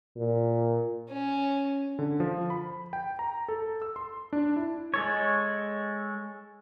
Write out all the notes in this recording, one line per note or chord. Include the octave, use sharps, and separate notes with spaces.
A#2
C#4
D3
F3
B5
G5
A#5
A4
E6
C6
D4
E4
G#3 A4 C#5